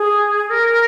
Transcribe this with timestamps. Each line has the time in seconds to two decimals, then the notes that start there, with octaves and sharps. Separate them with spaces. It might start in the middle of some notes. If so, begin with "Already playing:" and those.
Already playing: G#4
0.50 A#4